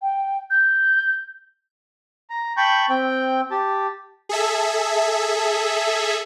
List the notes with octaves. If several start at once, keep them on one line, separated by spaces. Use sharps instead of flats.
G5
G6
A#5
G5 A5 B5 C#6 G6
C4 G5
G4 A5
G#4 A4 E5